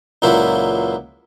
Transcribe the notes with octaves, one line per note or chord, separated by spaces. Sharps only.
C#2 A#2 F#3 E4 C5